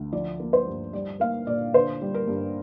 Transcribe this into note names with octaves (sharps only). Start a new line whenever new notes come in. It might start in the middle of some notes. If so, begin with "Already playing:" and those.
Already playing: D2
F3 D5
A#3
C5
G2
G3 D5
A#3 F5
A#2 D5
D3 C5
G3
A#4
G2